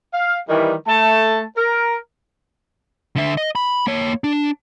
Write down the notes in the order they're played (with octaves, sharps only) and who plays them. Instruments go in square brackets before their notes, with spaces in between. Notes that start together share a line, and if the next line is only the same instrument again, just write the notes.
[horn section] F5
D#3 E3 G3
A3 A5
A#4
[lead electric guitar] D3 E5
D#5
B5
A#3 C#5
D4